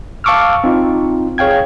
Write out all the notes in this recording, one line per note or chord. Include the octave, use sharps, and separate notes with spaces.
F5 A5 C#6 D6 E6 F6
C4 D#4 F4
G#4 C#5 F5 G5 G#6